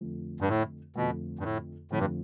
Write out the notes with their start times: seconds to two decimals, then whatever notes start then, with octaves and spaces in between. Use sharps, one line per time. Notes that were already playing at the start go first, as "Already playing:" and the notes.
0.01 F2 D3 F3 A3
0.41 G2
0.49 A2
0.95 F2 B2 D3 F3 A3
1.39 G2
1.44 A2
1.91 F2 A2 D3 F3 A3
1.98 G2